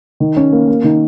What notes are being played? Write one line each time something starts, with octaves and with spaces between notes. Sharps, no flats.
D#3
C#4
A#3
A#3
D#3